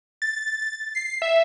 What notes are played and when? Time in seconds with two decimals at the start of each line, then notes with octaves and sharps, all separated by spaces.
0.22 A6
0.95 C7
1.22 E5